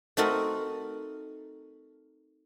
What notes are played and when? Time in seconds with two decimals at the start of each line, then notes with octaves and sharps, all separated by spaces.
0.17 A3 C4 D#4 F#4 A4 A#4